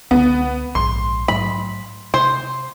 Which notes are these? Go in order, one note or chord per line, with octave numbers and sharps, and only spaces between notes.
C#2 D3 B3
A#1 G#2 C6
G#2 F#3 A3 B5
C3 C5